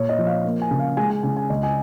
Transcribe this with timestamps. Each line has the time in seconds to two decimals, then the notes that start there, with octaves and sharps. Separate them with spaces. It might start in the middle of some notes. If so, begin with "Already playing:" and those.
Already playing: A#2 C#5
0.09 D#5
0.18 F3
0.27 F5
0.45 A#3
0.62 G#5
0.71 C#3
0.79 F5
0.97 G#3 G#5
1.10 G#5
1.23 C#3 G#5
1.37 G#5
1.50 C#2 D#5
1.63 G#5